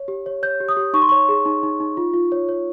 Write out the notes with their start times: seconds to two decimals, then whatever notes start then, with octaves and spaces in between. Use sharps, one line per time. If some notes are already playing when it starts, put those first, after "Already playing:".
Already playing: C#5
0.08 G4
0.26 C#5
0.43 C#5 G6
0.60 G4
0.69 D#6
0.77 G4
0.93 D#4 C#6
1.02 C6
1.09 C#5 C#6
1.29 G#4
1.45 D#4
1.63 D#4
1.80 D#4
1.97 F4
2.13 F4
2.32 C#5
2.49 C#5